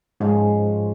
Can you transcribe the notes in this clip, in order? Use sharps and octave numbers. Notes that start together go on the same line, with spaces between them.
G#2 F3 G#3 C#4